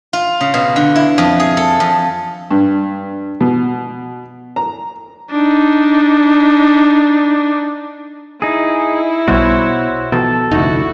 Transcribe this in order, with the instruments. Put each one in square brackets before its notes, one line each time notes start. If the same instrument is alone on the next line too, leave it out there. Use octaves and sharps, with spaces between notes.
[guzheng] F4
C#3
B2
D3
E4
F2
G#4
A4
F2
[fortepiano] G2
B2
A#5
[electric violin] D4 D#4
[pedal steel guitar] D#4 G#4 [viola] E4
[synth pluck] B1 G3 [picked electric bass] B2 [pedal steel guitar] F#4 C5 C#5
[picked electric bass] B2 [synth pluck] D#3 F3 [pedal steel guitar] A4
[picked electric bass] F1 D2 [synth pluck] D#4 [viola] E4 F#4